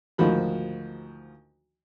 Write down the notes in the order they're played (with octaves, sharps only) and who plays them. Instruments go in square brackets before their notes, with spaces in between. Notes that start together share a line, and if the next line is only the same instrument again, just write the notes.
[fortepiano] D2 G#2 D#3 F3 F#4 B5